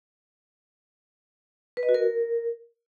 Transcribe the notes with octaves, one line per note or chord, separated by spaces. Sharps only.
B4
D#5
F#4
A#4